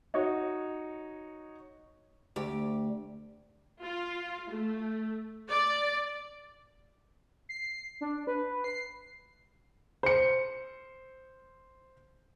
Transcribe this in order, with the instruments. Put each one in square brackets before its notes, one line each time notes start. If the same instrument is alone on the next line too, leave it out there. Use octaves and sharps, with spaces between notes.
[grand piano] D#4 F#4 C#5
[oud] D2 G4
[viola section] F4
A3
D5
[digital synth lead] C7
D4
B4
C7
[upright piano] C5 C#7